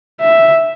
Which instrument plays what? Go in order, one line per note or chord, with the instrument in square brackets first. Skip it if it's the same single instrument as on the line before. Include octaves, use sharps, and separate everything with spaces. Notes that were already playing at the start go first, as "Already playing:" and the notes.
[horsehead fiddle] E5